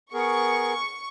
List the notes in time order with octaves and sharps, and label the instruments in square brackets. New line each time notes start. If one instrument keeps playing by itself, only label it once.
[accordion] B3 G#4 A#4 [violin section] C#6